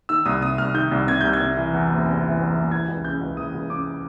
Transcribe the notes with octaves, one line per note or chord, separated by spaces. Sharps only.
D#3 E6
C2 D#6
C3 D#6
C2 F6
D#3 G6
C2
C3 G#6
C2 G6
G#6
C3
E3
E2
F#1
C3
E3
E2
F#1
E3 G#6
C#2
C#3 G6
C#2
E3 D#6
C#2
C#3 D6